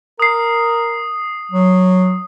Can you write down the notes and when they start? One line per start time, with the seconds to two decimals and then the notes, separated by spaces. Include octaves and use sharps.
0.20 A#4 D#6 C7
1.52 F#3